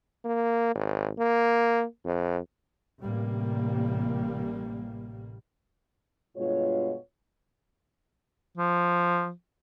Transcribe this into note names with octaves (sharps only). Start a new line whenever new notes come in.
A#3
G#1
A#3
F2
A1 C3 G3 A#3
G2 B2 G#3 F4 C#5
F3